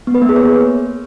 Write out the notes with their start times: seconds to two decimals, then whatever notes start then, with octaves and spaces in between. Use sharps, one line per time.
0.07 B3
0.15 B4
0.22 A#3
0.29 G#4
0.36 C#5